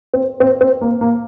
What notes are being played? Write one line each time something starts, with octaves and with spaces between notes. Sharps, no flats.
C4
C4
C4
A#3
A#3